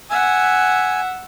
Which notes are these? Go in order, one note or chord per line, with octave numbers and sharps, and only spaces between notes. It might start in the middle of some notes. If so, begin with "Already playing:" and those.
E5 F#5 G#5